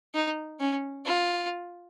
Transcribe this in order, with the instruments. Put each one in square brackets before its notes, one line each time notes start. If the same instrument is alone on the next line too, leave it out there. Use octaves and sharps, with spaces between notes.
[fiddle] D#4
C#4
F4